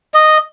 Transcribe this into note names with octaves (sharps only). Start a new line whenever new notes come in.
D#5